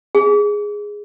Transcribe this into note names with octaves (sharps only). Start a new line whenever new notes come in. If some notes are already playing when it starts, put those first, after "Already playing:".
G#4